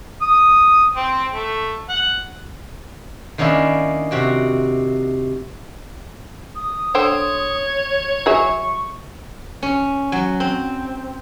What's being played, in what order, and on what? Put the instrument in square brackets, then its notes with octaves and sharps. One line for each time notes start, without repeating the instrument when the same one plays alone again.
[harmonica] D#6
C4
A3
F#5
[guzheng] D#3 A#3 C#4 D4 E4
C3 F#4 G5
[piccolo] D#6
[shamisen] D3 C5 G5 [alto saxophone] C#5
[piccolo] G#6
[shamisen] F#3 G#4 E5 [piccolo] C#6
[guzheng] C#4
F#3
C4